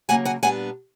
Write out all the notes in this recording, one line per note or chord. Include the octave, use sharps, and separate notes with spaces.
C#3 F#3 A#3 F#5 G#5
F#5 G#5
A#2 G3 B3 D4 F#5 G#5